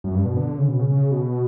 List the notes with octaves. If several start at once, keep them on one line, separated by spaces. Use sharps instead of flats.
F#2
G2
B2
D3
D3
C#3
B2
C#3
C#3
B2